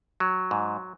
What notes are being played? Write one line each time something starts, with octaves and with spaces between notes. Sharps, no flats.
F#3
G#2